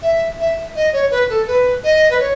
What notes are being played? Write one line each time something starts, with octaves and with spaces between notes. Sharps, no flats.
E5
E5
D#5
C#5
B4
A4
B4
D#5
B4
C#5